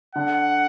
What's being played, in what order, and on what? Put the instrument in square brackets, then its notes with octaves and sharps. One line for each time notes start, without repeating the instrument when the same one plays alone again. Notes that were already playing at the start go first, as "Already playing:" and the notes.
[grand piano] D3 [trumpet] F#5